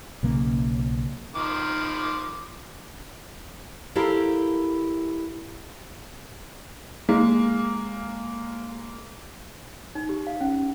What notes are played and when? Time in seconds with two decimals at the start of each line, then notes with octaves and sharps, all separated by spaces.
0.23 B1 C#3 A#3
1.35 D#3 F3 D6
3.95 E4 G4 A4 A#4 C5 F5
7.09 G#3 A#3
9.95 D#4
10.09 G4
10.27 F5
10.41 C#4